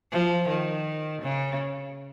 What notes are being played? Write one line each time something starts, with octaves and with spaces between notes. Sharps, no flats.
F3
D#3
C#3